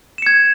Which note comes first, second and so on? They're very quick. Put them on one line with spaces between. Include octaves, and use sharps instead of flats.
E7 C#7 G#6